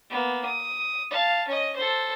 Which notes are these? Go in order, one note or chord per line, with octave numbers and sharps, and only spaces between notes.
A#3 B3
D#6
F5 A5
C#4 D#5
A4 C5